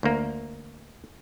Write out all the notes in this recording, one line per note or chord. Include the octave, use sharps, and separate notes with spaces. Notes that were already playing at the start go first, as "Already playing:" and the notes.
D2 A#3